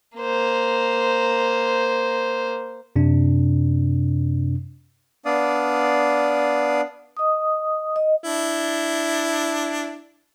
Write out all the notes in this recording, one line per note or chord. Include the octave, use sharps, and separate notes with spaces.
A#3 C5
F#2 C3 D4
B3 D4 D5 F5 D#6
D#5 D#6
D#5
D4 E4